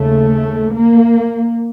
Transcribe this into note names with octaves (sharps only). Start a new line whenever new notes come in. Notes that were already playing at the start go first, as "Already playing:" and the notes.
Already playing: D#2 C#3 A3
A#3